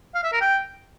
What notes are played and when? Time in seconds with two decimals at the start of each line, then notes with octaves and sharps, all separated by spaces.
0.15 F5
0.24 E5
0.32 A#4
0.41 G5